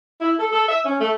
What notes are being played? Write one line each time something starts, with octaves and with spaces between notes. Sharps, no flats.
E4
A4
A4
E5
C#4
A3